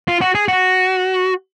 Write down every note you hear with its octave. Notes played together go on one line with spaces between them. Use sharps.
F4
F#4
G#4
F#4